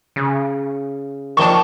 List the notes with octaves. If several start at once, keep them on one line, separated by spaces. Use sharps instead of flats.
C#3
D#3 F3 D4 A5 C#6